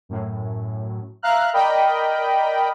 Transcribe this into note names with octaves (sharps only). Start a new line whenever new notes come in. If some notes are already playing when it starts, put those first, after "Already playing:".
F#2 A2
E5 F5 A#5 F6 F#6
A#4 D5 D#5 G5 B5